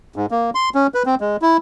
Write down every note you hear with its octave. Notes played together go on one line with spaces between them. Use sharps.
G#2
A#3
C6
C#4
B4
C4
G#3
E4